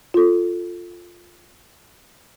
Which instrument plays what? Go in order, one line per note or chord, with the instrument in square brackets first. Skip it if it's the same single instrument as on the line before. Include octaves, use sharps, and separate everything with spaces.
[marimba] F4 A4